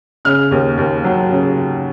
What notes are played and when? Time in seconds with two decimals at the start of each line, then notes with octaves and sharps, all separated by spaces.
0.25 C#3 F6
0.51 D#2
0.78 D#2
1.04 F#3
1.30 C#3